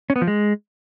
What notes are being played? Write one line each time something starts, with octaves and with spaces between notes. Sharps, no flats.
C#4
B3
F3
G#3